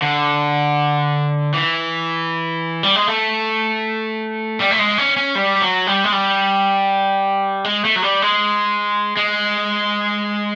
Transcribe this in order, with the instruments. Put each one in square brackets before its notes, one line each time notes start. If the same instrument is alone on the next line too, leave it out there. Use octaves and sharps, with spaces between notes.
[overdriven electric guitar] D3
E3
G3
G#3
A3
G3
A3
G#3
C#4
C#4
G3
F#3
G3
G#3
G3
G#3
A3
F#3
G3
G#3
G#3